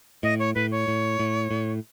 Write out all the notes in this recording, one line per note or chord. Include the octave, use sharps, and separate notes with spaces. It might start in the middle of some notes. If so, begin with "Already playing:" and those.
A2 D#5
C#5
A2 B4
C#5
A2
A2
A2